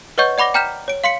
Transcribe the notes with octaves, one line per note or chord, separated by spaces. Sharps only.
B4 C#5 D#5 F#5 C#6 G6
D5 F#5 B5 D6 A#6 G7
G5 A#5 F6 G6 B6 E7
C#5 D7
F5 C6 B6 C#7